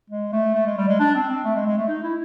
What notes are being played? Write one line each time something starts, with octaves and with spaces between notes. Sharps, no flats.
G#3
A3
A3
G#3
G3
G#3
D4
C4
C4
A3
G#3
G#3
A3
D#4
E4